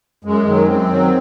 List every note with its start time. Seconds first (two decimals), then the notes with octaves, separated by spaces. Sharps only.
0.24 F#2 G#3
0.46 D#3 F#3
0.66 F#2 C4
0.88 D#3 F#3